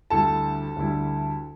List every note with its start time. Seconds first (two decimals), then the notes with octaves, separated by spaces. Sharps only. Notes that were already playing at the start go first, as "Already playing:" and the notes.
0.10 D2 D3 G3 E4 A4 A5
0.76 D2 D3 G3 E4